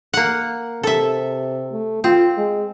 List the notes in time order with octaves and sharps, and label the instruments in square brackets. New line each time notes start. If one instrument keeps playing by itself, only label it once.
[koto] A#3 F#5
[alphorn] C3 [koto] A4 E5
[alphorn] A3
[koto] C4 [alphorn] F4
[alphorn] G#3